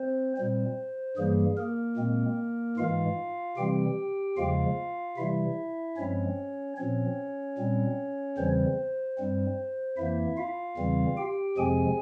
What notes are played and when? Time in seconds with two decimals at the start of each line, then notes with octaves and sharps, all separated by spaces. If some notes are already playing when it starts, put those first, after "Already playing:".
Already playing: C4 C5
0.37 A#2 G3 C4 C5
1.17 G2 E3 G3 A#3 G#4
1.57 A#3 A#4
1.97 A#2 G#3 C4
2.77 G#2 E3 G#3 F4 F5
3.57 C3 E3 G3 C4 G4 G5
4.37 E2 C#3 F3 G#3 F4 F5
5.17 C3 E3 G3 E4 E5
5.97 G2 F3 G#3 C4 C#4 C#5
6.77 A#2 F3 C4 C#4 C#5
7.58 A#2 G3 C4
8.37 E2 C#3 E3 G3 C4 C5
9.18 G2 G3 C4
9.97 F2 E3 A#3 E4 E5
10.37 F4 F5
10.77 E2 C#3 E3 G3 C4
11.17 G4 G5
11.57 F2 C3 F3 G#3 C4 G#4 G#5